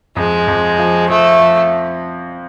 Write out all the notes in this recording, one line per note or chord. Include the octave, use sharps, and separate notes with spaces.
F2 G#3
F2
F3
F3 A3
F3